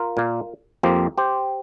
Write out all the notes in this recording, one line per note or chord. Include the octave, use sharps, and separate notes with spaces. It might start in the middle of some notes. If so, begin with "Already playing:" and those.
Already playing: F4 A#4
A#2 A#3
F2 F3 A#3 G4 C5
G4 C5